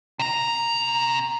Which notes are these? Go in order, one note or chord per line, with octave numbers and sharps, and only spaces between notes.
C3 A#5